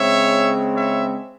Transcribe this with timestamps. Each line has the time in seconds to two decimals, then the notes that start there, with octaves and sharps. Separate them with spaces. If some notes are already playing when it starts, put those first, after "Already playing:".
Already playing: C#3 G#3 C4 C#5 E5
0.75 C#5 E5